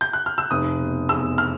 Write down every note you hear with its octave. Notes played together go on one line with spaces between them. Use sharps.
G6
F#6
F6
E6
F1 D#6
B2
E2 E6
F6